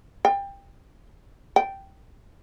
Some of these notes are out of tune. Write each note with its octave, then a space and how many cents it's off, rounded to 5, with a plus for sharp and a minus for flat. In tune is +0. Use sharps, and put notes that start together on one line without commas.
G5 +20
G5 -5